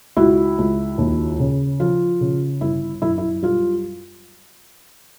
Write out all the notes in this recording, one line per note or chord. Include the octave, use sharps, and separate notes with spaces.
C#2 E4 F#4
C#2
D#2
C#3
F3 F4
C#3
G1 E4
F#2 E4
E4
G3 F4